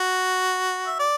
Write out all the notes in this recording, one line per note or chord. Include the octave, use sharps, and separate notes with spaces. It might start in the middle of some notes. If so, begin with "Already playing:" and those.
Already playing: F#4
E5
D5